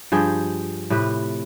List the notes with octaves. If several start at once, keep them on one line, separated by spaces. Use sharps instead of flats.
G2 F3 G#4 G5
A2 C3 B4